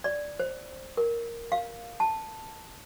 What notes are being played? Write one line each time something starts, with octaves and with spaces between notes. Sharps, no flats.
D5
C5
A#4
F5
A5